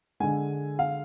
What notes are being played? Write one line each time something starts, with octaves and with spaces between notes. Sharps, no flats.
D3 G#3 G#5
F5